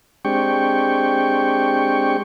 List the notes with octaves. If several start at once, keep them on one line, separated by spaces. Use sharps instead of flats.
G#3 C4 D4 G4 G5 C#6